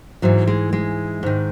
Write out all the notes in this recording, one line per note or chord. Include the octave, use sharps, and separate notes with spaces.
G#2 E3 F#3
G#3
G#3
G#2 D#3